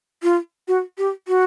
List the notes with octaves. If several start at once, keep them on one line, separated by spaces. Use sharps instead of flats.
F4
F#4
G4
F#4